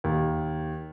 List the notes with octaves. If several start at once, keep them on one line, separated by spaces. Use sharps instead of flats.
D#2